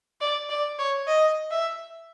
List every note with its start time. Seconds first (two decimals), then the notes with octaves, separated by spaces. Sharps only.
0.21 D5
0.49 D5
0.79 C#5
1.07 D#5
1.51 E5